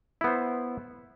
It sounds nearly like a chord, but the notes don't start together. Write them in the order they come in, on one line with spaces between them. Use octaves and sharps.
E4 B3 C5